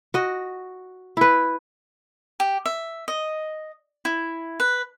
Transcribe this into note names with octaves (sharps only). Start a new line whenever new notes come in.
F#4 D#5
E4 B4
G4
E5
D#5
E4
B4